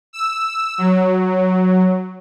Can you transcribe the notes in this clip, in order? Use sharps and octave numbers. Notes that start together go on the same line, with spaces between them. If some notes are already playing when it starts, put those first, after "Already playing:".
E6
F#3